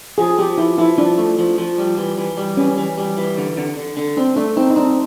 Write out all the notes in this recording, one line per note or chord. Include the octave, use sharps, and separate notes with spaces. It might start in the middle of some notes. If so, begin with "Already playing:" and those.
F3 G#4
F3 G4
F3 E4
F3 E4
F3 D4
A3
F3
F3
G3
E3
E3
G3
E3 C#4
E3
G3
E3
D3
D3
D3
D3
C4 D4
A3 D4
C4 D#4
D#4
C4 D4